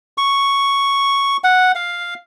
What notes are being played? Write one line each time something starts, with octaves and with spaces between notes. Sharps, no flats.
C#6
F#5
F5